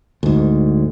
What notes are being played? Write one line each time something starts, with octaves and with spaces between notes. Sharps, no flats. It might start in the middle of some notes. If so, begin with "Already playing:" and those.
D2 G#2